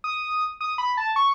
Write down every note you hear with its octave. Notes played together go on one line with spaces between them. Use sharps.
D#6
D#6
B5
A5
C#6